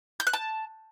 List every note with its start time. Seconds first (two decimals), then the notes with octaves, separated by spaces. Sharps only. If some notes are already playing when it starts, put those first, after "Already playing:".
0.20 G6
0.27 F#6
0.33 A5